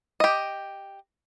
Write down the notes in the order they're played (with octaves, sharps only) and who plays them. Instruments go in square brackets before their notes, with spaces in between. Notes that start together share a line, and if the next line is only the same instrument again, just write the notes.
[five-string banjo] G4 D#5